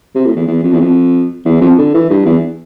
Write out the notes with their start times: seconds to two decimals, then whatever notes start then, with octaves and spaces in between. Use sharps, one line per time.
0.15 C3
0.26 A2
0.36 E2
0.48 E2
0.63 F2
0.73 E2
0.80 F2
1.45 E2
1.61 F2
1.78 D3
1.94 E3
2.10 G2
2.25 E2